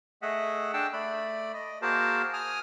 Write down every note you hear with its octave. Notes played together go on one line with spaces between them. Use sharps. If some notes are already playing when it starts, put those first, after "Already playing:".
A3 G#4 D#5 E5 F#5
D4 G#4 G5 A5 E6
A3 D5 B5
D#5
A#3 F#4 G#4 A#4 C5 A5
G#5 D#6 F6